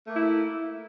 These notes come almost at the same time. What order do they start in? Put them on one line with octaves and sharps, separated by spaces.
A3 A#3 E4